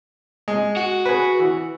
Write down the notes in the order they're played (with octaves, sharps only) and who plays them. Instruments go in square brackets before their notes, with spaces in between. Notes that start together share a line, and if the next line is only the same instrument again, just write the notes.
[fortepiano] G#3
[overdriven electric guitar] F#4
[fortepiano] G#4 B4
E3